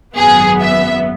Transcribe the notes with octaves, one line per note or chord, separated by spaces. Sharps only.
G#1 F#2 F#3 B3 G#4
E5